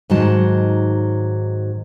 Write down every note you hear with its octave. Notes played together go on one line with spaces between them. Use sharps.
G#2 D#3 F#3 A5